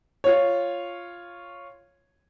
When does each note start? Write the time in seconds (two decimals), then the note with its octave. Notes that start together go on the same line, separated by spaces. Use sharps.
0.24 F4 C#5